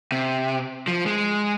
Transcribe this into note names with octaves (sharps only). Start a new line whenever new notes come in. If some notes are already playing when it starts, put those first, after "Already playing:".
C3
F3
G#3